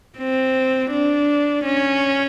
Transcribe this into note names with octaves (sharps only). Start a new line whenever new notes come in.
C4
D4
C#4